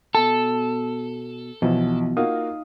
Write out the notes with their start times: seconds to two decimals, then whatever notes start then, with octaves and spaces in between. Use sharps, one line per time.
0.15 B2 A4 A5
1.62 B1 B2 E3 F3 E4
2.17 A#3 D#4 F4 F#4 F5 D#6